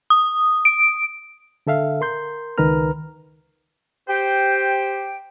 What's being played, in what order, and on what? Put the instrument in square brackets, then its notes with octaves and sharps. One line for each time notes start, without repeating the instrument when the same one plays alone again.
[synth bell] D#6
D7
[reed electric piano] D3 A4 E5 F5
A#4 C6 G6
C#2 D#3 A#4 B4 A#5 F6
[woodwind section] G4 C5 G5